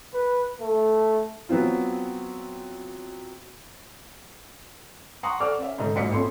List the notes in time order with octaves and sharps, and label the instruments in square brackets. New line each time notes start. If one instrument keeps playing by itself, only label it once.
[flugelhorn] B4
A3
[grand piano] F#3 B3 C4 F4
[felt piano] F#5 A#5 C6 C#6 D#6
A4 C5 D5 F#5 D6 F6
C#4 E5
G#2 D3 D#4
A#1 G#2 F#3 D#5 B6 C#7
A#1 F2 C#4 A4 B5 C6